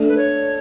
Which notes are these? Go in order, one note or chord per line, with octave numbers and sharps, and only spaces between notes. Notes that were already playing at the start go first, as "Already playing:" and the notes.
Already playing: A3 D4 A4 D5
B4
C#5